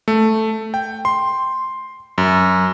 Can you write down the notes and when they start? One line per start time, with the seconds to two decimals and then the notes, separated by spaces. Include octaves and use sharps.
0.08 A3
0.74 G5
1.05 C6
2.18 F#2